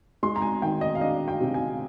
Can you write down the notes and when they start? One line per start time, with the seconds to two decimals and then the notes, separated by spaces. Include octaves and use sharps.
0.23 G#3 C6
0.36 A#5
0.42 G#5
0.62 D#3 G5
0.81 D#5
0.95 F5
1.01 D4 D#5
1.28 G5
1.40 C3
1.54 G#5